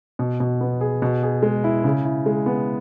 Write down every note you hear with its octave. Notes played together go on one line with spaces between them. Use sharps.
B2
B2
B3
G#4
B2
G#4
G#3
E4
C#3
E4
G#3
B3